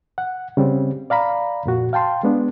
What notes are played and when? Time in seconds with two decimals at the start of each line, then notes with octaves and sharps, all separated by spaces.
0.18 F#5
0.57 C#3 G3 C4
1.10 D5 F5 A#5 B5
1.65 F2 A#2 F#4
1.93 F5 G5 A5 C6
2.23 G#3 B3 D4